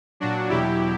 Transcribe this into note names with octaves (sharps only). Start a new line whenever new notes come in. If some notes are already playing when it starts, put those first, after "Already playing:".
A#2 F#3 D4 F#4
E2 B2 F#3 E4 G4